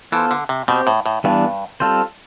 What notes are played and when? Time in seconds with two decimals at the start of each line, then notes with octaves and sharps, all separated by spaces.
0.12 E3 B3 F4 A4 C5
0.31 D3
0.49 C3
0.68 B2 C4 G4 C5
0.87 A2
1.06 A2
1.24 G2 E3 G3 B3 D4
1.80 G3 C4 F4 A4 C5